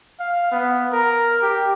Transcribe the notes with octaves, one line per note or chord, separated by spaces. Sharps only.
F5
B3
A#4
G4